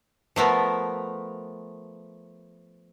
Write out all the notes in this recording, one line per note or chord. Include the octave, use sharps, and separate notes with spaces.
F3 A3 B3 A#4